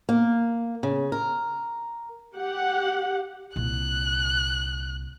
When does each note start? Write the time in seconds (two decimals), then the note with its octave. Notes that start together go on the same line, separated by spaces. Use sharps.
0.09 A#3
0.83 C#3
1.12 A#4
2.35 G4 F#5
3.56 C2 A#2 F#6